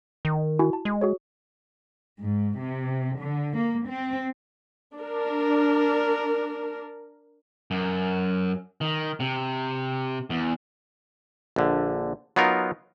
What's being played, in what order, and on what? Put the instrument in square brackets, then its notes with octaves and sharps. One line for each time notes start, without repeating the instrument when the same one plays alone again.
[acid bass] D#3
[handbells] E4 F#4 G#5
A5
[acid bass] G#3
[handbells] F#4 G#4 C#5
[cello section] G#2
C3
D3
A#3
C4
[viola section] D4 A#4
[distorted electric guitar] F#2
D#3
C3
E2
[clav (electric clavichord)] A#1 D3
F#3 B3 D#4 F4 A#4